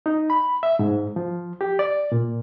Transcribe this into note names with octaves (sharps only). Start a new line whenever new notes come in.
D#4
B5
E5
G#2
F3
G4
D5
A#2